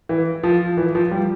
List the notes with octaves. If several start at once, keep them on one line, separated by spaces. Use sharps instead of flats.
E3
F3
E3
F3
G3